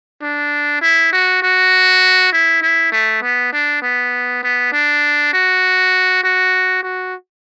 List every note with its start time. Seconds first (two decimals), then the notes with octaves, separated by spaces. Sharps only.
0.22 D4
0.81 E4
1.12 F#4
1.42 F#4
2.32 E4
2.62 E4
2.92 A3
3.22 B3
3.52 D4
3.82 B3
4.43 B3
4.72 D4
5.33 F#4
6.23 F#4
6.83 F#4